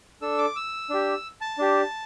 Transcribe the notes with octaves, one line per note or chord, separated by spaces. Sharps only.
D4 A4 E6
D6
E6
D4 G4
A5
D4 G4